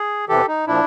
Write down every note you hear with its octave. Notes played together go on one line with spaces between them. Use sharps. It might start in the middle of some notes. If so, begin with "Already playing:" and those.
Already playing: G#4
E2 C3 E3 G4 A4
D#4
A#2 F3 D4 E4